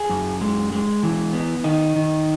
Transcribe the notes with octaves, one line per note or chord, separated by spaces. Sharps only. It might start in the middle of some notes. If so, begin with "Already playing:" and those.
Already playing: G#4
F#2
G#3
G#3
E3
B3
D#3 D#4
D#3